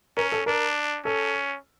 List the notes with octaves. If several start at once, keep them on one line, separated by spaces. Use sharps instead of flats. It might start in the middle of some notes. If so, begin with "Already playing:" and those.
C#4 A#4
A4
D4 A#4
C#4 A4